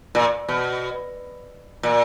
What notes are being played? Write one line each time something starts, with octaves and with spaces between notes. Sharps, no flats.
A#2
B2
A#2